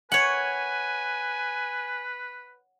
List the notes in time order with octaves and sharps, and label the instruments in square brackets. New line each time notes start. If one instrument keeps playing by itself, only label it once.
[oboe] B4 [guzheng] C#5 F#5 [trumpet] G#5